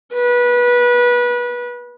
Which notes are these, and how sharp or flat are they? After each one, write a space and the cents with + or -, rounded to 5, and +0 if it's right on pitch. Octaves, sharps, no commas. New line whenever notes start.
B4 -25